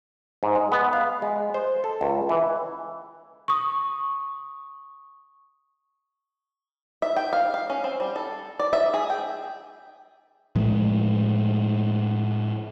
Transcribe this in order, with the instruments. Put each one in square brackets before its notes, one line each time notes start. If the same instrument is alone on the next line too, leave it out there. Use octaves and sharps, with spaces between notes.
[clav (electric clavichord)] G#2
G#3
B3
F5
G#3
C5
A4
C#2
E3
[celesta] C#6 D#6
[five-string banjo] E5
G5
F5
F5
C#4
C4
G3
A4
D5
E5
G#4
G5
[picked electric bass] A2 F3 G#3 A3